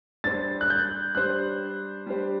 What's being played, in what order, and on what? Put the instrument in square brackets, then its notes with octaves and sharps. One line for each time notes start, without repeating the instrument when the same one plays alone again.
[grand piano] G3 D4 G4 C5 [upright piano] A6
[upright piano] F#6
G6
[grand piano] G3 D4 G4 C5 [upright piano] F#6
[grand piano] G3 D4 G4 C5